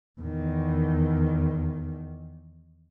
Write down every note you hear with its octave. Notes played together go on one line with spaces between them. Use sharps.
E2 D#3